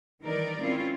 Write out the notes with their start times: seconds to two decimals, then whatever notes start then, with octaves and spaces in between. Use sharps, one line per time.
0.21 D#3 E3 G3 D#4 A#4 D5
0.61 G#3 C4 C#4 E4 F4